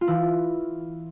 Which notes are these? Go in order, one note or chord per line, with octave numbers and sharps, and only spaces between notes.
F4
E3 E4